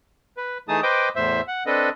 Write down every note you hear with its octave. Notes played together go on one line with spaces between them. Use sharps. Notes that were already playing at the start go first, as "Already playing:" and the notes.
B4
E3 A3 D#4 G#4 A5 D#6
B4 C5 D#5 G5 D6
E2 A2 C5 E5
F#5
C4 D4 A4 B4 D#5